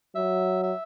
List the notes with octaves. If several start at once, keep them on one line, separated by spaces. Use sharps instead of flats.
F#3 E5
E5